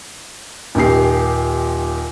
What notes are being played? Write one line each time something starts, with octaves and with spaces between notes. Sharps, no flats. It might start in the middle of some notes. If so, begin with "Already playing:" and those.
D#1 A#2 D#4 G4 C7